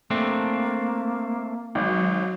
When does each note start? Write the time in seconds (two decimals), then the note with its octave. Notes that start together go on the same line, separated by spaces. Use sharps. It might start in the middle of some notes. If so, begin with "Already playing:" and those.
0.11 A3 A#3 C4 D4
1.75 G#1 F#3